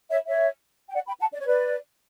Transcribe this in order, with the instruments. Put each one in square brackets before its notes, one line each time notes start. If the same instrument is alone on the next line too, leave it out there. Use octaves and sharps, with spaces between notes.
[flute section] C#5 E5
C#5 E5
G5
D5 F#5
G5 B5
F#5 A5
D5
C#5
B4 D5